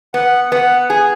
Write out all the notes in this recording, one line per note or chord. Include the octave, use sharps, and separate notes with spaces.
B3 F#5
B3 F#5
G#4 G#5